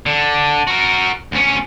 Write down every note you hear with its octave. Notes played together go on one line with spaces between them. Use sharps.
D3
F#4 A#4
D2 C#4